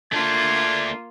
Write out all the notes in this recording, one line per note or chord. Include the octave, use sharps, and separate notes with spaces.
A3 A#3 D4 F4 G#6